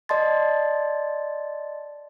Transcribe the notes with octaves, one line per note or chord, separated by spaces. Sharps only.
D5 D#5 A5 C6 A6